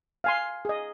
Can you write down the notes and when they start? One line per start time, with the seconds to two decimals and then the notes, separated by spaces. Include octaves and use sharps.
0.24 F5 G#5 C6
0.65 G#4 D#5